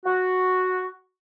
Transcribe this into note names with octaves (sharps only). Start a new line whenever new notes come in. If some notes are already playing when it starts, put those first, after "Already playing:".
F#4